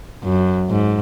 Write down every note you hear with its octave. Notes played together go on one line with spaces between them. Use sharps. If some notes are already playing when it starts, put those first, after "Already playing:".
F#2
G#2